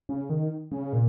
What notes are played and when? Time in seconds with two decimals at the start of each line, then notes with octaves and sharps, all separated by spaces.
0.09 C#3
0.29 D#3
0.72 C#3
0.93 A#2